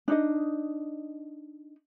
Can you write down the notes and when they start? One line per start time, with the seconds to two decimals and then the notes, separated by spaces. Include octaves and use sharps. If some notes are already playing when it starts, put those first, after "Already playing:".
0.08 D4 D#4 D#5